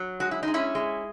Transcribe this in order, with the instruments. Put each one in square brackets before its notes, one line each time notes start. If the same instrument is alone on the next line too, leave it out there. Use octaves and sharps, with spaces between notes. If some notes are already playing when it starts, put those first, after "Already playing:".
Already playing: [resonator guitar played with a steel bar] F#3
G#3 F#4
E4
G#3 D#4
C#4 E4
G#3